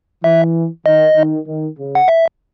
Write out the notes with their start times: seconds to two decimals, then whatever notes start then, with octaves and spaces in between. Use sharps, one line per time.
0.24 E3 E5
0.85 D#3 D#5
1.16 D#3
1.46 D#3
1.78 C#3
1.95 F#5
2.08 E5